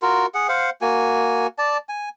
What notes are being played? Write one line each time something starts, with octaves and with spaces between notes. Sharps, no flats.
F4 F#4 A#4
G#4 F#5
C5 F5 F#5
A#3 F#4 G#5
D5 A5
G#5